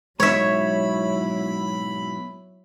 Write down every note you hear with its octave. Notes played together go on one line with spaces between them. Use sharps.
G#2 B2 F#3 E4 C#5 E5 B5